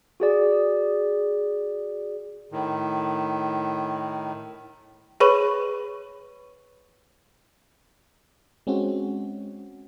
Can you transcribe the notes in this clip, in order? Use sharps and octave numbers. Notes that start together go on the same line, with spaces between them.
F#4 G#4 D5
A2 D#3
G#4 B4 C#5 B5 C#6 D#7
G#3 C4 C#4 F#4